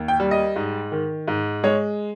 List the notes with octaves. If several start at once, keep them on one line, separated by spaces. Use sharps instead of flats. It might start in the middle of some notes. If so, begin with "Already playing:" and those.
Already playing: D#2
G5
G3
D#5
G#2
D#3
G#2
G#3 C#5